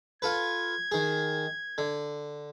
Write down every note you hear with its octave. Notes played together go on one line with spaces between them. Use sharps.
F4 A4 B4 G#6
D#3 G#4
D3